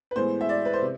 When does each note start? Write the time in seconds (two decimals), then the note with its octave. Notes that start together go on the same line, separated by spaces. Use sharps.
0.11 B4
0.16 A2 E3 G#3 B3 C5
0.41 E5
0.49 D5
0.65 B4
0.74 C5
0.82 C3